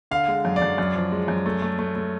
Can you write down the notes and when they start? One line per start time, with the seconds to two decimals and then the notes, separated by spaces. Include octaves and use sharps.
0.11 D3 F5
0.28 G#3
0.45 F#2
0.56 D5
0.62 F#2
0.78 F#2
0.95 F3
1.12 G#3
1.28 F#2
1.46 A3
1.62 A3
1.79 A3
1.96 A3